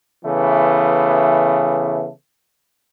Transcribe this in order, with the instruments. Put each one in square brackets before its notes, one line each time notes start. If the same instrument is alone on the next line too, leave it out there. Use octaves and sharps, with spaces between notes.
[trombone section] C#3 E3 A3 B3